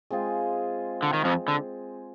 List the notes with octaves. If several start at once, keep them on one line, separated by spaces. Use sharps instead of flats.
G#3 C4 F4 G#4
D3
D#3
F2 F3
D3